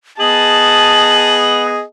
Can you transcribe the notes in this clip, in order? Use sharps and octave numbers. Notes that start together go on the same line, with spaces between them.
B3 G#4 D#5 A5 F#7